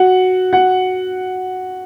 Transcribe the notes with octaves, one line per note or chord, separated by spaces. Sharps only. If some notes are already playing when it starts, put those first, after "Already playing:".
Already playing: F#4 F#5
F#4 F#5